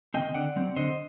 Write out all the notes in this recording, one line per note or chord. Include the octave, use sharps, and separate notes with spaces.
D#3 G3 C4 D#5 G5
D3 D5 F#5
F#3 C4
D3 C5 D#5